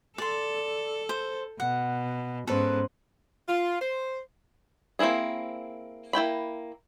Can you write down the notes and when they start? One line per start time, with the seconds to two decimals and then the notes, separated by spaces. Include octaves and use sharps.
0.18 A4 D5 C6
1.09 C5
1.60 B2 F#5
2.47 G#2 B3 C#4 A4 B4 C5 C6
3.49 F4
3.81 C5
4.99 A#3 C4 C#4 E4 G#4
6.13 A#3 E4 G5 B5